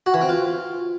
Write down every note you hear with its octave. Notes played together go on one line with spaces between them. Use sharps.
F#4
E3
C4
F4